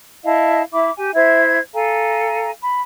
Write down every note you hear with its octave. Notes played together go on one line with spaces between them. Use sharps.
E4 D#5 F5 A5
E4 E5 B5 D6
G4 G#5
E4 C5 E5 G#6
A4 F5 G#5 A#5
B5